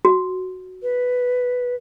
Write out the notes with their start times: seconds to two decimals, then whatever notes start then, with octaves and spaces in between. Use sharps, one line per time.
0.05 F#4
0.83 B4